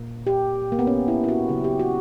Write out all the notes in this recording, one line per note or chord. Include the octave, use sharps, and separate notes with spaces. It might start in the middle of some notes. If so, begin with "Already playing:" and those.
Already playing: A#2 A#3
G4
A#3
B3
C#4
E4
E4
F#4
C#3 F#3 A#3 G4
G4
F#4